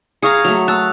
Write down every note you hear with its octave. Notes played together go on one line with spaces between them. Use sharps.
G#4 F5 A#5 C#6 D#6 C#7
F#3 A3 F7
A5 E6 F#6